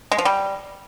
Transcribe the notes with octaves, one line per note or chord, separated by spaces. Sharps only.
G#3
F3
G3